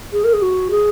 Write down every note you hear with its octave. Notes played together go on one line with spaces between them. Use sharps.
G#4
A#4
G#4
F#4
G#4